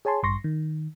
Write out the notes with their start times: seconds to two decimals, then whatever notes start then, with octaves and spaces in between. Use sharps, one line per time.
0.05 G#4 C#5 G#5 A5 C6
0.23 A1 G2 C6 C#6 A#6
0.44 D#3